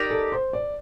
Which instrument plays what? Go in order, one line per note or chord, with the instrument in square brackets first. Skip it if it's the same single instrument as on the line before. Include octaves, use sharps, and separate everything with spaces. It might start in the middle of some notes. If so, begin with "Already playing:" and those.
Already playing: [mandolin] D#4 G4 A#4 D5
[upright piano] A4
C5
D5